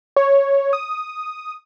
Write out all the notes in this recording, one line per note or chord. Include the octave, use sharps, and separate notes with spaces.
C#5
D#6